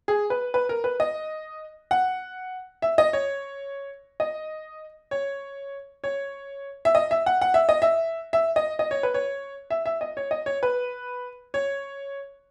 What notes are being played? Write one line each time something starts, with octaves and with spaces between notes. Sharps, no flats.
G#4
B4
B4
A#4
B4
D#5
F#5
E5
D#5
C#5
D#5
C#5
C#5
E5
D#5
E5
F#5
F#5
E5
D#5
E5
E5
D#5
D#5
C#5
B4
C#5
E5
E5
D#5
C#5
D#5
C#5
B4
C#5